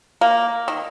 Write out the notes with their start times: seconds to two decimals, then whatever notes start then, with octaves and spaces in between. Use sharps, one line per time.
0.21 A#3
0.68 D#3